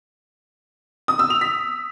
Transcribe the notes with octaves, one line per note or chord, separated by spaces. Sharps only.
D#6
E6
F7
B6